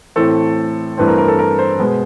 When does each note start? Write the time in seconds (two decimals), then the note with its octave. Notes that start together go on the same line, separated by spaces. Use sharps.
0.16 A2 E3 A3 C4 A4
0.97 G2 E3 A3 C4 B4
1.08 A#4
1.18 A#4
1.28 A4
1.39 A#4
1.59 C5
1.79 B2 G#3 B3